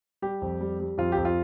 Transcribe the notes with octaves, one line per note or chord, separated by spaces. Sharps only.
G3 G4
F2
G3
G3
F2 F4
F2 G4
F4